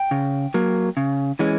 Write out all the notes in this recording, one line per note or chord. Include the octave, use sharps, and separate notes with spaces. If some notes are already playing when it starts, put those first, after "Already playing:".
Already playing: G5
C#3
F#3 A#3
C#3
E3 G#3 C#4